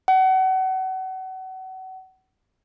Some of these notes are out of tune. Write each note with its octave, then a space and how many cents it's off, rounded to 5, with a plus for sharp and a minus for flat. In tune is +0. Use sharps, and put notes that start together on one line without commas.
F#5 +30